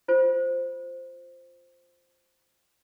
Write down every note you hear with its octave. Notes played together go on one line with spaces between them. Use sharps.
F4 C5